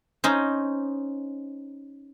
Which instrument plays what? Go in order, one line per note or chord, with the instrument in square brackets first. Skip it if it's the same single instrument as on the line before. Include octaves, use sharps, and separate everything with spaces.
[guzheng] C#4 D#4 C5